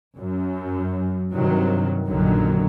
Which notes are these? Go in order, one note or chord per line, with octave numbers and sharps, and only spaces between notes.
F#2
G2 C3 D#3 F#3
A#1 F#2 D3 D#3 F#3